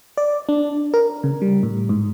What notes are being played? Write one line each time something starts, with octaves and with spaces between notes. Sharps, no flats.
D5
D4
A#4
C#3
G3
A2
G#2